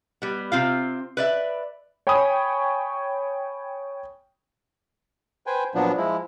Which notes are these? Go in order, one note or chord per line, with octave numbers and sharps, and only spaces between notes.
G3 B3
C3 C4 F4 F5
B4 D5 E5
C#5 G5 G#5 B5 C#6 D#6
B4 C5 G5 G#5
A#2 F3 F#3 B3 D4
F3 G#3 E4